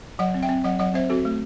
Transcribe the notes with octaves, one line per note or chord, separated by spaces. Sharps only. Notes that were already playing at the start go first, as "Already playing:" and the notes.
F#3 D#5 F#5
C4
E5 G5
C4
F#3 D#5 F#5
F#3 D#5 F#5
C4 C5 E5
C4 F#4 A4
A3